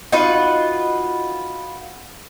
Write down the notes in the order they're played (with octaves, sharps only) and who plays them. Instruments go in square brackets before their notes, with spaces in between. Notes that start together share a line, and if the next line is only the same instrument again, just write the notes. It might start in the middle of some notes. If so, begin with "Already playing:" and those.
[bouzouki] D#4 F4 F#4 B4